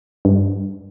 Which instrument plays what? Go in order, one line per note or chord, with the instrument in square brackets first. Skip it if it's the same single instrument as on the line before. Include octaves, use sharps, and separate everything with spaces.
[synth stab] G2